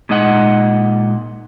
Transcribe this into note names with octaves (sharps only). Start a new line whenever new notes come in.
A#2 G#3 D#4 D#5 F#5